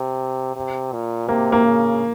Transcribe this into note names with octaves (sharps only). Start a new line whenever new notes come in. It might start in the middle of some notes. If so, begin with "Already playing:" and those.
Already playing: C3
C3
A#2
C3 A#3
A#3
C#3